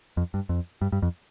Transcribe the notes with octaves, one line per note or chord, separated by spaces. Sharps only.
F2
G2
F2
G2
G2
F2